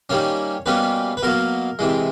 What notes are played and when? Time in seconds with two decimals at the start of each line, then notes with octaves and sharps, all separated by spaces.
0.10 D#3 G3 A#3 C#4 C#5
0.66 B2 G3 A#3 C#4 B4
1.17 B4
1.23 B2 F#3 A#3 A#4
1.79 C3 E3 G#3